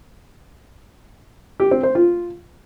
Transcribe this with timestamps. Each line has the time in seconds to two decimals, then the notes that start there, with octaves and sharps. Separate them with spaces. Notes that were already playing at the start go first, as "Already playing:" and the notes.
1.60 G4
1.71 C4
1.83 C5
1.95 F4